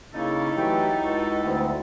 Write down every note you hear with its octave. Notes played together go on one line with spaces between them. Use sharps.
C#3 A#3 C#4 D#4 E4 A4
E3 F#3 A3 G4
C#2 F#4
D2 D3 B3 C4